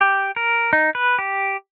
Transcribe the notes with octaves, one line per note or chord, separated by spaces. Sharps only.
G4
A#4
D#4
B4
G4